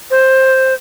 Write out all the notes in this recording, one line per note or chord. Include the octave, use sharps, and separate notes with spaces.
C5